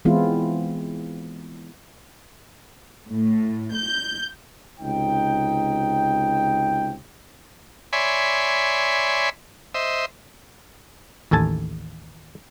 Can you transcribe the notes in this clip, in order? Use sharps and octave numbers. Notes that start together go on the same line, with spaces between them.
E3 G#3 B3 C4 E4 F4
A2
G6
C#2 C3 D#4 G5
C#5 D5 E5 G#5 B5 C6
C5 D#5 E5
A1 D#2 A4 G#5 A5